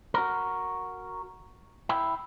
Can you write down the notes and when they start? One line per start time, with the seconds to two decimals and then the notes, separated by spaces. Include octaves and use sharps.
0.14 F#4 A#4
1.89 E4 G5